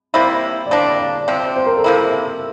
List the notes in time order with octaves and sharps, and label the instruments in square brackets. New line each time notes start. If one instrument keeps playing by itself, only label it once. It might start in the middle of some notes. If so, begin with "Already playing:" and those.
[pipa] C3 G3 A#3 E4 [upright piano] C5
[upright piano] D5
[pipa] G3 A#3 D4 [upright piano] C5
[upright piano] D5
[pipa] C3 F3 C4 [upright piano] C5
[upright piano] C5
A#4
A4
[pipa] C3 F3 A#3 E4 [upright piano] A#4